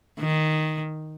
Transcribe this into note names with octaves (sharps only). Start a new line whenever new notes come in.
D#3